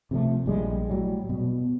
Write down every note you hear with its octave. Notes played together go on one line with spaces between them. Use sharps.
C3 F3 F#3 A3
A#1 G3 G#3
A2 F#3 G3
B2